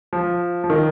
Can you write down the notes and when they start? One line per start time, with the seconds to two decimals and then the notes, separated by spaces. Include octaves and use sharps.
0.13 F3
0.64 F3
0.70 D#3